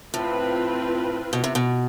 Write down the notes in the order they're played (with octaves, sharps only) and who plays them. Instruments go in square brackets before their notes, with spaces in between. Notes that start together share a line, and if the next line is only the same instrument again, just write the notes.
[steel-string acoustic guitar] A2 [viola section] C4 F4 B4
[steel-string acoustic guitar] B2
C3
B2